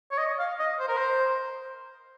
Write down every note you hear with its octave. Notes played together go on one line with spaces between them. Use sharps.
C#5
D#5
F5
D#5
C5
A#4
C5